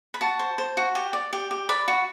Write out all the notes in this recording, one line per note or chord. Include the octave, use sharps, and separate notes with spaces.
B5
F#4 A5
C5
C5
F#4
G4
D5
G4
G4
D5 B5
F#4